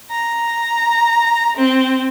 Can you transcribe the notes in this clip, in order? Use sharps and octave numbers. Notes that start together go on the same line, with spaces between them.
A#5
C4